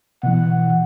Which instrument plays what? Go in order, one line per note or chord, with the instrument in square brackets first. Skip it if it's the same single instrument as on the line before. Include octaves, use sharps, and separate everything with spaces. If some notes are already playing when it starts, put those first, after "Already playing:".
[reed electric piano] B2 E3 [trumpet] F#5